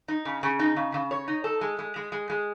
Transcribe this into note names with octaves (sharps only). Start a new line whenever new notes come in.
D#4
C#3
C#3
D#4
C#3
C#3
C#5
D#4
A4
G#3
G#3
G#3
G#3
G#3